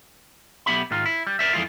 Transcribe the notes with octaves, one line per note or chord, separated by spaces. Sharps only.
B1 B3 G4 E5 B5
G#2 D#3 F4
E4
G3
A#4 C5 D5 E5
F2 E3 G#3 F4